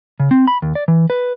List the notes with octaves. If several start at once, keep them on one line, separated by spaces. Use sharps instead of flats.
C#3
C4
B5
D#2
D5
E3
B4